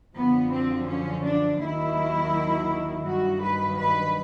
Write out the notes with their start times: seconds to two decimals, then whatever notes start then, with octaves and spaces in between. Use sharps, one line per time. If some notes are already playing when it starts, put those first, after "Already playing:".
0.14 F#2 D3 F3 B3
0.50 C4
0.86 C#4
1.23 D4
1.59 D#2 D#3 F#3 E4
3.06 G2 D#3 F#3 F#4
3.41 B4
3.79 B4